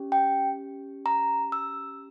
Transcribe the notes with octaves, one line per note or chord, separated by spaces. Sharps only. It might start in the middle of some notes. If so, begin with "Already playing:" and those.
Already playing: C#4 G4
G5
A#5
E6